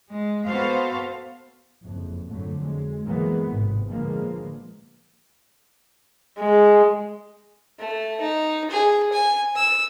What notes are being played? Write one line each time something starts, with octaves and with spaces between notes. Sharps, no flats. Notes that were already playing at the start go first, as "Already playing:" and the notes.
G#3
B3 F#4 A4 C5 F5
F#1 F2
F2 D3 F#3 A3
G#3
E3 F#3 G#3 A#3 B3
G#1 A2 C3
A#2 D3 F3 G#3 A#3 B3
G#3
A3
D#4
G#4
G#5
E6